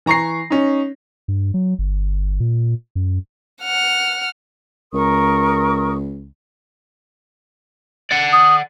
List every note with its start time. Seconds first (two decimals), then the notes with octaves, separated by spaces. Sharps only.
0.06 E3 A#5 C#6 A#6 C7
0.50 C#4 D#4
1.28 G2
1.54 F#3
1.79 G1
2.40 A#2
2.95 F#2
3.62 F#5 F6
4.93 C#2 A#4 C#6 D#6
8.11 D5 F#5
8.32 D#6